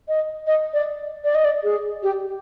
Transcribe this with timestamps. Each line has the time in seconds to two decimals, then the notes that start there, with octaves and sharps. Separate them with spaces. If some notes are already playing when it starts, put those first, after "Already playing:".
0.08 D#5
0.47 D#5
0.73 D5
1.24 D5
1.35 D#5
1.45 D5
1.64 G#4
2.03 G4